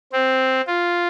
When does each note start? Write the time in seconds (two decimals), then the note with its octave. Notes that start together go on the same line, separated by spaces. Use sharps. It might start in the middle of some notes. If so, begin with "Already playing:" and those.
0.13 C4
0.67 F4